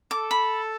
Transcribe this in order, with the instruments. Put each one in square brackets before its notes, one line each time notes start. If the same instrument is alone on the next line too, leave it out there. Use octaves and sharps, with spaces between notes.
[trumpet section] A4 [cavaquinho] D6
[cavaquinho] B5